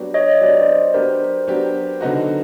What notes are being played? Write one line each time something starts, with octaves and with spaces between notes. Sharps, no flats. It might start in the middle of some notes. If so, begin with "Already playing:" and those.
Already playing: F#3 B3 D4 G4
C#5 D#5
F#3 B3 D4 G4 D5
D#5
C5 D5
F#3 B3 D4 G4 A#4 C5
F#3 B3 D4 G4
D3 F#3 B3 D#4 F#4